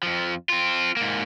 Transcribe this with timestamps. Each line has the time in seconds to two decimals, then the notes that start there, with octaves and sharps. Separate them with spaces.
0.03 F2 F3
0.49 C4 F4
0.97 G#2 A#3